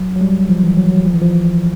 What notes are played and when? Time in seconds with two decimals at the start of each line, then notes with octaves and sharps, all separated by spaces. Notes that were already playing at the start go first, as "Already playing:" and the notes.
Already playing: F#3
0.16 F#3
0.21 G3
0.49 F3
0.63 E3
0.77 F#3
0.92 F#3
1.05 F3
1.14 E3
1.21 F3